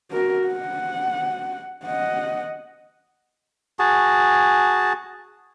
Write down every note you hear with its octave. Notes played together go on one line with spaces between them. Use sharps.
F#4 A#4
F#5
D#5 F#5
F#4 G#4 A5